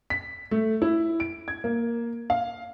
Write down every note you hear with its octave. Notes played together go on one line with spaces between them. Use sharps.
B6
A3
E4
D7
G#6
A#3
F5